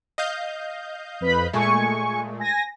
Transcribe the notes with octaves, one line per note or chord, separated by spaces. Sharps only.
D#5 F5 G6
F2 B4 B5
A#2 G#3 A3 G#5 C#6
G#5 A#6